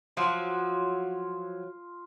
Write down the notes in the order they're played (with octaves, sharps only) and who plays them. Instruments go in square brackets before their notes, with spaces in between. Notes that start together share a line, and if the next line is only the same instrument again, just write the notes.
[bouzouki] F3 F#3 F#4 [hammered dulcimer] F4